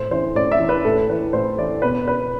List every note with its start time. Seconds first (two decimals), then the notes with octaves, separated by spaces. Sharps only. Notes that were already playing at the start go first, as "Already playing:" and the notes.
Already playing: A2 C5
0.11 E3 C5
0.35 A2 D5
0.52 E5
0.60 E3
0.69 B4
0.85 A2 A4
1.10 E3 B4
1.33 A2 C5
1.58 E3 D5
1.82 B2 B4
2.08 B4